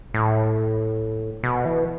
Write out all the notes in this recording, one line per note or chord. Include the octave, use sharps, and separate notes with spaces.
A2
B2
E3